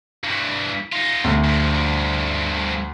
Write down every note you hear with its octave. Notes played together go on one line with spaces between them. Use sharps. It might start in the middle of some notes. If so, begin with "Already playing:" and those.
G2 E3
D#4 F4
D2
G2 F3